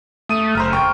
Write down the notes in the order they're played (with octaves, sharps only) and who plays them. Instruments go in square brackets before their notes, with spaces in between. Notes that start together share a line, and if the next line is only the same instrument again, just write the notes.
[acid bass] A3 [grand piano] D#6 D#7
[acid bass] F#1 [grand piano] C5 A#5 F6
[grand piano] G5 C#6 F6